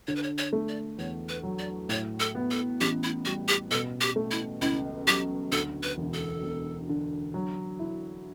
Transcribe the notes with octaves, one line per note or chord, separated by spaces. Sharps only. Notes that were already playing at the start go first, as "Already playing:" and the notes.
D3 C#5
B4
C#5
C#5
A3
D5
E2 C#5
B4
F#3
D5
A2 C#5
A4
B3
A4
A1 G4
E4
G3 F#4
G4
B2 A4
G4
A3
E4
C#2 E4
F#3 G4
D2 A4
B4
E1
A4
E1
D3
F#3
E4